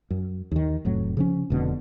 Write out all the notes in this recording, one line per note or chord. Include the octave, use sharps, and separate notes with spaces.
F#2
D#2 D#3
F1 A2 F#3
C#3 F3 C#4
F1 B2 D3